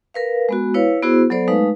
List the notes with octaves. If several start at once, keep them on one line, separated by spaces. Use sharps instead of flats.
A#4 B4 F5
G#3 B3 F#4
E4 B4 C#5 F5
B3 E4 F#4 G#4 C5
F#3 B3 A4 C5 D5
G#3 A3 D#4 B4 F5